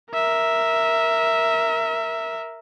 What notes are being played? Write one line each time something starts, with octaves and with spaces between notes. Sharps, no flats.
A#4 E5